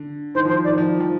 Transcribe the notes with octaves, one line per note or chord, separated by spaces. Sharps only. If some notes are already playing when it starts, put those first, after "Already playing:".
Already playing: D3
D#3 C5
F3 C5
D5
D#3
F3
F3